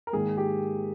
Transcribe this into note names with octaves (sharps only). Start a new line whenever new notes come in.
A#4
G#2 D#3 A#3 G#4
G4